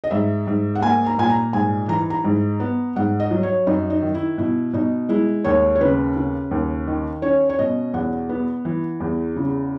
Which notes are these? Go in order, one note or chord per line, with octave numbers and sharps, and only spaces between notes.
D#5
G#2 E5
G#2
F#5
A#3 G#5
A#5
A#2 G#5
A#5
G#2 G#5
E3 A#5
A#5
G#2
B3
G#2 F#5
D#5
F#3
C#5
F#2 D#4
D#4
D#3
E4
B2 E4
B2 D#4
G#3 E4
D#2 C#5
C#5
C#3 B4
C#3
D#2
D#3
C#4 C#5
C#5
B2 D#5
E2 F#5
B3
E3
E2
C#3